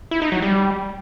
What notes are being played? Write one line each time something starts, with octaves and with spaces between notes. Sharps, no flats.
E4
D#4
F#3
G3